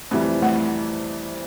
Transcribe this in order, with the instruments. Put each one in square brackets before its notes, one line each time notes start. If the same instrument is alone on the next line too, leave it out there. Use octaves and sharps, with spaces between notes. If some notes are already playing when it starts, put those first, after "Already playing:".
[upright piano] F2 C3 E3 G3 [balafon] A3
[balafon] A3